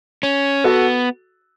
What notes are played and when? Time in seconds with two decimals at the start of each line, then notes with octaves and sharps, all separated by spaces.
0.23 C#4
0.64 B3 F#4 A4